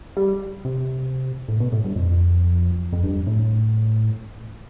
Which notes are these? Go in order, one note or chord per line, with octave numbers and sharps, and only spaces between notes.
G3
C3
A2
B2
A2
G2
F2
F2
G2
A2